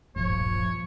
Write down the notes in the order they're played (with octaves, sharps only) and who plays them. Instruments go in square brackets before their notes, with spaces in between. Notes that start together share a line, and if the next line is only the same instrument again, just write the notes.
[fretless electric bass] D1 A#1 G2 [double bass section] A#2 F3 [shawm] C#5